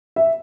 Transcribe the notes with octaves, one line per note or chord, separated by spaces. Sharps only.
E5